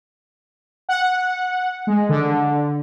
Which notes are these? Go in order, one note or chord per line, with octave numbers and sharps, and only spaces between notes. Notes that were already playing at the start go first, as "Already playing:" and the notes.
F#5
G#3
D3